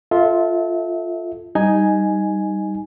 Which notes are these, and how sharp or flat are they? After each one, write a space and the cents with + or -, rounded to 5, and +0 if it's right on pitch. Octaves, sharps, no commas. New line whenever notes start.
F4 +0 A4 +0 E5 -30
G3 -5 D#4 +0 G#5 +0